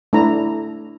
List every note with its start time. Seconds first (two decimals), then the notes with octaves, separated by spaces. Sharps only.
0.13 A3 D4 E4 A#5